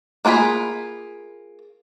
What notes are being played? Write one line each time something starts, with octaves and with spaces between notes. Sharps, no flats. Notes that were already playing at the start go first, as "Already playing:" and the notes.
A#3 D4 F4 G#4 B5